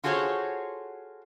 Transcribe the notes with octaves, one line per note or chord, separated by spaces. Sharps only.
F4 F#4 G#4 A4 C5 C#5